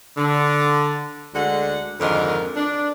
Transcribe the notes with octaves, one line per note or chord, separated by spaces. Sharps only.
D3
D2 D3 G#3 F#5
F2 G#2 D3 D#3 A#4
D4